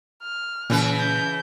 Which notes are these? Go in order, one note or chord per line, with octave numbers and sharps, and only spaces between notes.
F6
A#2 C#3 E3 B4
G6